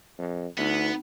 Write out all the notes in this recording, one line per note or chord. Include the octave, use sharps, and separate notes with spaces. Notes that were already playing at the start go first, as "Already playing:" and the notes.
F2
D2 B3 D#4